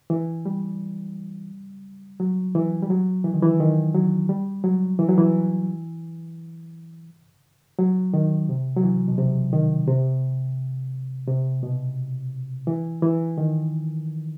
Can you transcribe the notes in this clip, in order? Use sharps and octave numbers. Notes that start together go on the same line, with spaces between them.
E3
G3
F#3
E3
G3
F#3
E3
D#3
E3
D#3
F#3
G3
F#3
E3
F#3
E3
F#3
D#3
C3
F#3
E3
B2
C3
D#3
C3
C3
B2
E3
E3
D#3